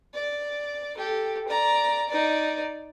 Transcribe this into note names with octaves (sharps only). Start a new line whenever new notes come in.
D5
G4 A4
D5 A#5
D#4 D5